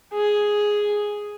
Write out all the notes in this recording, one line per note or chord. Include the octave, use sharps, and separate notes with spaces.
G#4